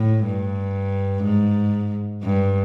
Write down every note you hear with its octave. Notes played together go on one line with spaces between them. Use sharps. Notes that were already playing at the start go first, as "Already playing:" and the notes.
Already playing: A2
G2
G#2
G2